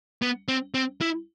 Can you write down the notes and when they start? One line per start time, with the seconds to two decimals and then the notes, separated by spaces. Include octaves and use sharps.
0.22 B3
0.48 C4
0.74 C4
1.01 E4